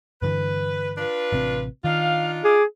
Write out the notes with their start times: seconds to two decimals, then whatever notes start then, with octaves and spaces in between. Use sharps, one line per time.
0.22 G2 D3 E3 B4
0.98 D4 F4 B4
1.32 A1 C3 C4
1.84 D#3 D4 D#4 F4 F5
2.45 G#4 D6